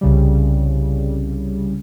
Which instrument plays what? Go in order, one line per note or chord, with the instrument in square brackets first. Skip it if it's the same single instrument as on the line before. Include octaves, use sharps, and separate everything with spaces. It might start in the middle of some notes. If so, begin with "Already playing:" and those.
[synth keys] C2 C#3 G3